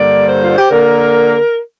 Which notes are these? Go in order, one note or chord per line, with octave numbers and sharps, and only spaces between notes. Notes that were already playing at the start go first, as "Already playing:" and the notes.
Already playing: G2 D3 A#3 D5
C5
F4
G4
D3 A#3 A#4